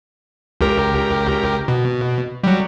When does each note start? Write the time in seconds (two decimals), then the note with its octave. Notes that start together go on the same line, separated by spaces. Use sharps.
0.61 C#2 G4 A#4
1.68 B2
2.44 F#3 G3